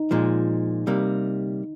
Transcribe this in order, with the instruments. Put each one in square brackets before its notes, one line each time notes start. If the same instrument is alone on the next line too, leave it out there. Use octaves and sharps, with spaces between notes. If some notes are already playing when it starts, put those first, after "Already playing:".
Already playing: [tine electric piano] D#4
[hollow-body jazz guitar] A#2 F3 G#3
C3 G3 A#3